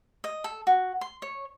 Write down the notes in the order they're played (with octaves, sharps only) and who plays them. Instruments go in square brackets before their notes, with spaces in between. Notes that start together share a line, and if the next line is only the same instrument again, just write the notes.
[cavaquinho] D#5
A4
F#4
C6
C#5